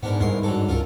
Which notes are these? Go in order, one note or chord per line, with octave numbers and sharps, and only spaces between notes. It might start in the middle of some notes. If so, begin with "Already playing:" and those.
G#2 B3 D4 A#4
C2 G2 A#4 C6
F#3 D4 A4
C#2 F4 A4 A#4